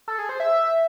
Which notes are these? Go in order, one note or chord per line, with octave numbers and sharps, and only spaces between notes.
A4
G#4
C5
E5